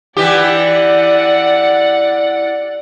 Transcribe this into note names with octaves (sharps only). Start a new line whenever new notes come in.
E3 G4 D5 F#5